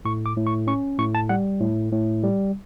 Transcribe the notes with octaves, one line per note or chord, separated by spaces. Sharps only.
A2 C#6
D6
A2
C#6
C#4 C#6
A2 C#6
A5
G3 F#5
A2
A2
G3